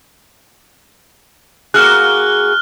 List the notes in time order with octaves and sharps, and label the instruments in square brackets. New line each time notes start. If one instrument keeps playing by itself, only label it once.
[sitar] A#3 F#4 G#4 [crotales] F6 F#6